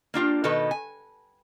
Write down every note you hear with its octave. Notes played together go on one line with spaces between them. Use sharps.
A#3 D4 F4 G4
B2 D#3 B3 A4 B4 D#5
G#5